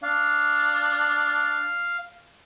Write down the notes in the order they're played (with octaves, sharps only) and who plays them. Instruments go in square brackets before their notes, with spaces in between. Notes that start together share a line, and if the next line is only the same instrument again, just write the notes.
[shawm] D4 [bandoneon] F5